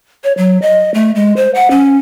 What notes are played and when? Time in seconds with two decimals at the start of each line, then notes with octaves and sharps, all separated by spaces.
0.24 C#5
0.38 F#3
0.62 D#5
0.94 A3
1.16 G#3
1.37 C5
1.55 F#5
1.71 C#4